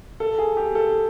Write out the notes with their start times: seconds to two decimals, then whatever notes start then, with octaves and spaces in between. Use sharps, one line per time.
0.20 A4
0.39 G#4
0.57 G4
0.75 A4